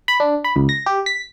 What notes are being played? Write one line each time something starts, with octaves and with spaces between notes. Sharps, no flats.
B5
D4
B5
C#2
A#6
G4
B6